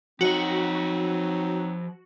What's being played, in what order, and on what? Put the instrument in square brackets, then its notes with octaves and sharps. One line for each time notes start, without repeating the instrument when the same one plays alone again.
[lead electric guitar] F3 D#5 [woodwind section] F#3 C4 D#4 [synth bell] F#4